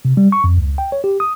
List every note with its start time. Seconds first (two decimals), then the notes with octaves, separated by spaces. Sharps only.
0.05 C3
0.17 G3
0.32 C#6
0.44 F2
0.57 C#2
0.78 G5
0.92 C#5
1.04 G4
1.20 D#6